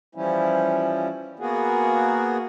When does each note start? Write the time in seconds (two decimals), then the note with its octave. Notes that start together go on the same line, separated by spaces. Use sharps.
0.15 E3 F3 G3 C#4 E4
1.39 A#3 B3 F#4 G#4